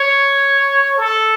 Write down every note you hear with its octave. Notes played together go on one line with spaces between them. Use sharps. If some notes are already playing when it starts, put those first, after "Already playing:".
Already playing: C#5
A4